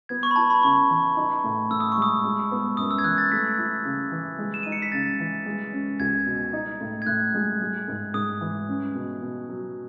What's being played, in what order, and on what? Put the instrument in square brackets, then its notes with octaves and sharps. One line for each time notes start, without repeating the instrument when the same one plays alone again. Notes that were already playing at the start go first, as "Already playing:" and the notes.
[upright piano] B3 [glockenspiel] G#6
[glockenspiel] C#6
B5
[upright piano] E4 [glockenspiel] A5
[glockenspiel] B5
[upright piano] C#3 [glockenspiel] C#6
[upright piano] E3
D#4
A2
[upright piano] A2 [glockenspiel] E6
[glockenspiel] D#6
C#6
[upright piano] G#3 [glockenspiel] D#6
[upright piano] G#3
B3
[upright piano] F#2 [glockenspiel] D#6
[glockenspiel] E6
G#6
[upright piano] E3 [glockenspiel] F#6
[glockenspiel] A6
[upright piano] A3 [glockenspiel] B6
[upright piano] E4
C#3
E3
G#3
[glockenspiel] E7
[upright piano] D#4 [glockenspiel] D#7
[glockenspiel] C#7
B6
[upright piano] C#3 [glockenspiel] A6
[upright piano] E3
G#3
C#4
[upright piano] C#2 [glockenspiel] G#6
[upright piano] B2
D#4
A2
[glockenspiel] G#6
[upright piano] A2 [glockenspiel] F#6
[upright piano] G#3
G#3
G#2
[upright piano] G#2 [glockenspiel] D#6
[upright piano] E3
C#4
B2
B2
F#3